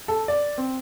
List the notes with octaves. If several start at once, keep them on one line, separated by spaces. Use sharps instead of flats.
A4
D5
C4